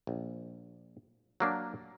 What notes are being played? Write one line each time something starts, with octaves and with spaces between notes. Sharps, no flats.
A#1
F#3 A#3 D4